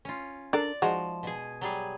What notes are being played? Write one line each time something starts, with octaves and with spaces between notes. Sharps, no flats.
C#4 F4
D4 A4 A#4 D5
F3 G#3 D#4 F#4
B2 G#4
F#3 G3 G#4